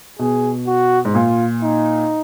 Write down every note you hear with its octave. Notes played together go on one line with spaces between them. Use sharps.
B2 G#4
F#4
G#2
A#2 F4
D#4